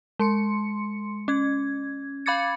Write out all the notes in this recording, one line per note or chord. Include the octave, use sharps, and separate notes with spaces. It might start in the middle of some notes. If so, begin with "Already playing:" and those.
G#3 C6 C#7
C#4 G#6
F5 B5 D6 G#6 A6 C#7